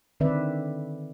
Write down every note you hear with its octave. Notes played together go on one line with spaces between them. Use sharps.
D3 D#3 C4 B4 D5 E5